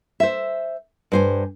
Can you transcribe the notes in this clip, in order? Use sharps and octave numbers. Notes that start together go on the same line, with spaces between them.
C5 E5
G2 C5 G#5